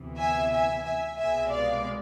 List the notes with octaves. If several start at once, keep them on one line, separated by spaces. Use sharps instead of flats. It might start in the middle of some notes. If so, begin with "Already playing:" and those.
Already playing: D2 C3 E3 B3
E5 G#5
E5 G#5
E5 G#5
C2 B2 G#3 B3 E5 G#5
D5 F5